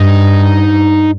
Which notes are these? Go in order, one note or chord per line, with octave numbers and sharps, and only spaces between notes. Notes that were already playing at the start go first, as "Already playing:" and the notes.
Already playing: G2 D#4